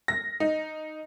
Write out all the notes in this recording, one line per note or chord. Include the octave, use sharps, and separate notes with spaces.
A#6
D#4